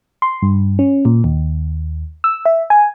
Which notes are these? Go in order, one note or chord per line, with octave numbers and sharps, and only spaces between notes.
C6
G2
C#4
A#2
D#2
E6
E5
G#5